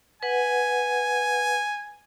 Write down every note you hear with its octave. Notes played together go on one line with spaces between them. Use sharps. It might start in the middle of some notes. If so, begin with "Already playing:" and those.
B4 F#5 G#5